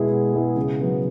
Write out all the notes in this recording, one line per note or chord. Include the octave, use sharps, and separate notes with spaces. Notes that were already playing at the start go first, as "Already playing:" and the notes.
Already playing: B2 G#3 B3 E4 G#4
B2
G#3 B3 E4 G#4
C#3
F#3 B3